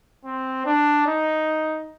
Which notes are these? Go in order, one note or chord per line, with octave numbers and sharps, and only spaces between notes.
C4
D4
D#4